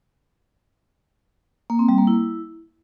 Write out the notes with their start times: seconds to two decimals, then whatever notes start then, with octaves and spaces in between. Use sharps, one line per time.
1.70 A#3
1.79 C4
1.89 G3
1.98 A#3
2.07 E4